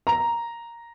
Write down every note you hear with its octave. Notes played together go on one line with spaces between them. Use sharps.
A#5